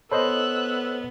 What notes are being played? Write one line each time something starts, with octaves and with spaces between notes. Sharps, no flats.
B3 A4 C5 C#5 D#5 B5 E6 F#6